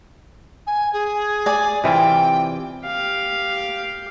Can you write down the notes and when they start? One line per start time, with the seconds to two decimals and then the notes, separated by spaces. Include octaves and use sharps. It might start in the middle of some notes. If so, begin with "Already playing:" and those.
0.67 G#5
0.93 G#4
1.46 D5 G#5
1.84 C3 E3 F4 G5
2.86 G4 F5